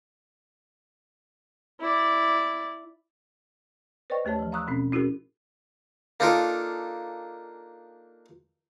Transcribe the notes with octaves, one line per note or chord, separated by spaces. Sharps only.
E4 D5
B4 C5 D5 D#5 G5 C#6
D#2 A3 G4 C#5 A5
E3 F3
F5 A#5 C#6 D#6 E6 F#6
B2 C4 C#4
C#4 E4 F#4 G#4 A#4
A#3 D4 D#4 F4 A4 A#4